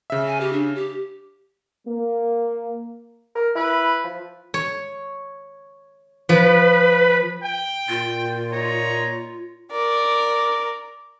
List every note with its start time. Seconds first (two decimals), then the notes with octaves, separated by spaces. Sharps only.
0.10 C#3 E5
0.27 G#5
0.41 G4
0.53 D4
0.75 G4
1.86 A#3
3.35 A#4
3.56 E4 B4
4.04 F3
4.54 C#5
6.29 F3 B4
7.44 G5
7.89 A#2 F4
8.52 D#4 C#5 A#5
9.71 A#4 D5